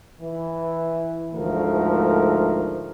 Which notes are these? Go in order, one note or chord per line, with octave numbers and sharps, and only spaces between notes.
E3
D2 G#2 F3 A3 A#4